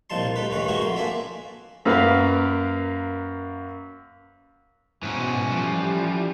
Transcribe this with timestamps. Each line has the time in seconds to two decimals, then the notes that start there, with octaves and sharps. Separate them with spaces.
0.10 C2 A#2 F3 D#4 A5 C6
0.36 D2 G3 D#4 B4
0.50 D2 G2 D#3 C#4 B4
0.68 G#3 D#4 E4 F#4 A#4
0.82 F2 C6
0.96 A#3 D4 D5 E5 G#5
1.85 F#2 A#3 A#4 B4 F5
5.03 G#2 B2 E3 C#4
5.51 F3 G3